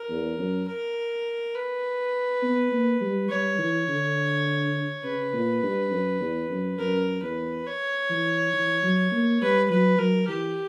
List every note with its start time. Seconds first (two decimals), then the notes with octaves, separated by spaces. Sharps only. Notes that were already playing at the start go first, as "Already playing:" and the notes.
Already playing: A#4
0.10 E2
0.39 F#2
0.68 A#4
1.55 B4
2.43 B3
2.72 A#3
3.01 G3
3.29 G3 C#5
3.59 E3
3.88 D3
5.04 C#3 B4
5.33 A#2
5.63 G2
5.91 F#2
6.21 E2
6.50 F#2
6.79 F#2 A#4
7.22 E2 B4
7.66 C#5
8.10 E3
8.54 E3
8.83 F#3
9.12 A#3
9.41 G3 B4
9.70 F#3 B4
9.98 F#3 A#4
10.28 E3 G4